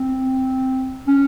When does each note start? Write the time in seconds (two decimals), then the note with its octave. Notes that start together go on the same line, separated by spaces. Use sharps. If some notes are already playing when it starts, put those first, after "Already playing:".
Already playing: C4
1.07 C#4